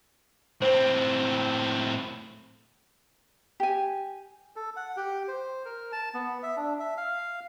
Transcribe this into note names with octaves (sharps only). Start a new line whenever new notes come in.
A2 C4 C5
G4 G#5
A4
F#5
G4
C5
A#4
A5
B3
E5
D4
E5
F5